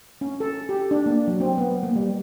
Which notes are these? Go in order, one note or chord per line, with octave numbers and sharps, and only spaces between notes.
C#4
A4
G4
D4
A#3
F#3
C4
B3
A#3
G3